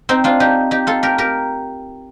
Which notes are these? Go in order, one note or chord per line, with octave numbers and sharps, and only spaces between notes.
C4 D#4
D4 F4
D#4 G4
D#4 G4
F4 A4
G4 A#4
G4 A#4